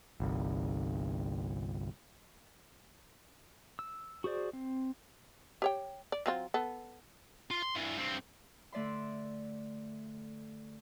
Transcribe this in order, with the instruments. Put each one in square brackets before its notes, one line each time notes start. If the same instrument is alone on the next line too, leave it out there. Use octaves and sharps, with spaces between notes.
[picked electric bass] G1 C2
[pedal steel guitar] E6
F#4 G#4 C5 D5
C4
[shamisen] G4 C#5 G5
D5
F#3 C4 F4
B3 A4
[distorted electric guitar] F4
C6
G2 E3
G2 C4
[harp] D3 A3 D5 E5 C6